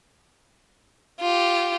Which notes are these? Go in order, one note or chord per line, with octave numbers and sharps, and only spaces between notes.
F4 G4